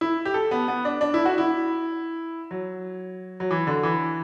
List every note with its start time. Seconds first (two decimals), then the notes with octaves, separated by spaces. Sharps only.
0.01 E4
0.25 G4
0.34 A4
0.51 B3
0.68 B3
0.85 D4
1.01 D4
1.14 E4
1.25 F#4
1.38 E4
2.51 F#3
3.40 F#3
3.51 E3
3.67 D3
3.83 E3